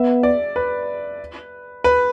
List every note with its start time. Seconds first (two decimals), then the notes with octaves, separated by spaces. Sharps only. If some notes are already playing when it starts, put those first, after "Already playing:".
Already playing: B3 E5
0.23 D5
0.56 B4
1.84 B4